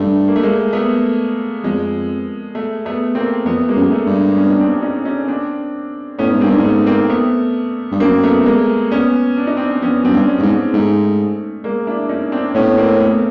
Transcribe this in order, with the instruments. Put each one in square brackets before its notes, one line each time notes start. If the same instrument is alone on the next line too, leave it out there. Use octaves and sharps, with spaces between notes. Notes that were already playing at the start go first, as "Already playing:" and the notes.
Already playing: [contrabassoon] G2 [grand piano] A3
[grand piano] A#3
A3
G#3 A#3
A3 B3
[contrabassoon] F2 [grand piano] G#3
[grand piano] A3
A3 B3
A#3 C4
[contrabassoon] F2 [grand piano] A3 B3
[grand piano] G#3 A#3
[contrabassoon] F#2
[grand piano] A3
[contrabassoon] G2
[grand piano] B3 C#4
D#4
C4 D4
C#4 D#4
C#4 D#4
C4 D4
[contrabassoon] A2 [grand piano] B3 C#4
[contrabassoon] G#2
[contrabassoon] G2 [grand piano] A#3 C4
[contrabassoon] G#2
[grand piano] A3 B3
A#3 C4
A3 B3
[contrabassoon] G2
[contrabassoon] F#2 [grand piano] A#3 C4
[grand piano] A3 B3
G#3 A#3
B3 C#4
D4
D#4
C4 D4
C4
[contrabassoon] F2 [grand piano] B3 C#4
[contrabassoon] F#2 [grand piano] C4 D4
[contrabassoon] G2
[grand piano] B3 C#4
[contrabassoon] G2
G#2
[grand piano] G#3
[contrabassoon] G#2 [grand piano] A3
[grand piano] G#3 A#3
D4 E4
C#4 D#4
C4 D4
[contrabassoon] A2 [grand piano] B3 C#4
[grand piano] C#4
A#3 C4
A#3
A3 B3